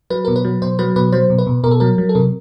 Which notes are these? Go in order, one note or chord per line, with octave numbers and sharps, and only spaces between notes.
F#3 B4
B2 A#4
B4
F#3
B2 C5
F#3 B4
B2 B4
F#3 C5
B2
B4
B2
B2 A#4
A4
F#3 A#4
F#3
A4
C3 A#4